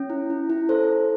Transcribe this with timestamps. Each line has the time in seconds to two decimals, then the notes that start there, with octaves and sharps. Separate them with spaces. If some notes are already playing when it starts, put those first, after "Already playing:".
Already playing: C#4
0.10 E4
0.30 E4
0.50 E4
0.69 A4 C5
0.89 A4